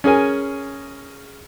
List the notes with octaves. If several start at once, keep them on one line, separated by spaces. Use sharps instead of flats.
C#4 G#4 A#4 G#5